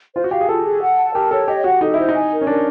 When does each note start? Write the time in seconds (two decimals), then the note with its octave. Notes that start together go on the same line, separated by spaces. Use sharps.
0.15 F4 C5
0.24 F#4
0.31 G4 F5
0.41 G#4
0.49 F4 A4
0.65 G#4
0.82 F#5
0.98 A5
1.14 G4 A#4
1.31 A4 C#5
1.48 G4 D#5
1.64 F#4 F#5
1.81 D#4 A4
1.94 E4 C5
2.09 D#4
2.14 G#5
2.31 A#4
2.41 C#4
2.47 D4 A#4